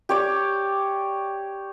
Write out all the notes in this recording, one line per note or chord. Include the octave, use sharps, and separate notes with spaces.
G4 C#5 D5